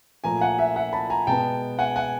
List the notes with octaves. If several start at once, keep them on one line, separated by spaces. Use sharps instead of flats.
A#2 F3 A3 G#5 A#5
F#5 G#5
E5 F#5
E5 F#5
A5 B5
G#5 A#5
B2 G#3 B3 G5 A5
F#5 G#5
F#5 G#5